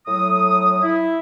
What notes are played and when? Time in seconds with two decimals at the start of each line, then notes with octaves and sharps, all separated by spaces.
0.07 A2 F#3 D#6
0.82 E4